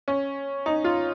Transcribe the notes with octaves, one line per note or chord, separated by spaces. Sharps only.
C#4
D#4
F4